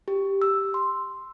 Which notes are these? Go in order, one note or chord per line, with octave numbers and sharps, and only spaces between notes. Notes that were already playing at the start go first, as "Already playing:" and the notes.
G4
E6
C6